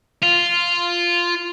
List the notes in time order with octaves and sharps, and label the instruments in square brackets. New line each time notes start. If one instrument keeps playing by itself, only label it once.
[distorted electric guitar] F4